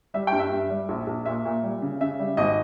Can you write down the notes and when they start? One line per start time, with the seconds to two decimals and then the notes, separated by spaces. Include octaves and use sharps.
0.14 G3 E5
0.27 G5
0.32 G2
0.39 E5
0.52 G2
0.70 G3
0.89 A#1
1.07 A#1
1.26 A#2 E5
1.45 A#2
1.63 G3
1.82 C#3
2.01 C#3 E5
2.19 G3
2.37 G#1 D#5